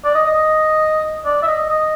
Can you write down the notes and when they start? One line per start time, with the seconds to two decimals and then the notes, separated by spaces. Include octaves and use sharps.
0.05 D5
0.15 D#5
0.26 D#5
1.25 D5
1.43 E5
1.47 D#5
1.69 D#5